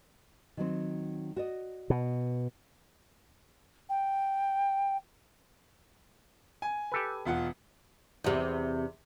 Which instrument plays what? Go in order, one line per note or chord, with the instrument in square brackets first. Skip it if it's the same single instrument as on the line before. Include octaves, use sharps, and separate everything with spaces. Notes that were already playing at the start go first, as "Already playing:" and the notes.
[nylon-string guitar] D#3 F#3 C4
F#4 D5 D#5
[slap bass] B2
[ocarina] G5
[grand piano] G#5
[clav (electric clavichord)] G4 A4 B4
[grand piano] E1 F4 F#5
[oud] E2 C3